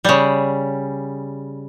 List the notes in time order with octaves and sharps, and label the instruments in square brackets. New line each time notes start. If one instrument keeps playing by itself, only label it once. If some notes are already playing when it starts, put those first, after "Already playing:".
[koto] C#3 G3